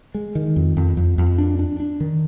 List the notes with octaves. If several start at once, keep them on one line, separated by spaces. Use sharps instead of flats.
G#3
D#3
F2
F2
F2
F2
D4
D4
D4
D#3